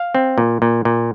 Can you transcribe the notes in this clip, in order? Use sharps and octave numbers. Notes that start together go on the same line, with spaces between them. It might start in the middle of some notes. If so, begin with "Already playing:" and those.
Already playing: F5
C4
A#2
A#2
A#2